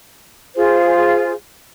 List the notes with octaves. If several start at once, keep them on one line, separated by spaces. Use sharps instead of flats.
F4 G#4 C5